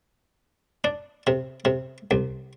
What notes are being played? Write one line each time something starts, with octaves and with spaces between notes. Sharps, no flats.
D4
C3
C3
C2